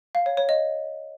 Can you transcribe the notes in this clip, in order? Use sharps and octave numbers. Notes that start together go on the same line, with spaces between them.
F5
C#5
C#5
D#5